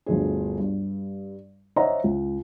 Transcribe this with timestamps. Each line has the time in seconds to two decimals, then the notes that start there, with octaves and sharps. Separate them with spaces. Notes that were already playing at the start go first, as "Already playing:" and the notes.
0.06 G1 D2 G#4
0.59 G2
1.76 C5 C#5 D#5 E5 F#5 A#5
2.04 C#2